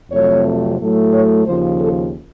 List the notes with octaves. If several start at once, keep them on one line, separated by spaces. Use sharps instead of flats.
F2 C3 F#3 A3 C#5
A2 F#3 A3
C#5
D#2 C#3 F3 C5
A4